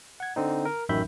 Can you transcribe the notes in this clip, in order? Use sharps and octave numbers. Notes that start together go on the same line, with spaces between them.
F#5 G#6
D3 C4 D#4
A#4
A1 F#2 D#3 E5 B5 G6